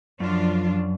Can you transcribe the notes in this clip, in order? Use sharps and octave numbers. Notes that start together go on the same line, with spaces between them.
F#2 F3 D4 F4